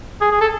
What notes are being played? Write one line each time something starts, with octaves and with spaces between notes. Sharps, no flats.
G#4
G#4
A4